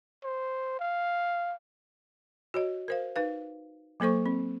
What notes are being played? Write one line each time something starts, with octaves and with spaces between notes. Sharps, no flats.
C5
F5
F#4 C#5 D#5
A#4 C5 F5
D#4 B4 F5
F#3 A#3 A4 C5 C#6
C4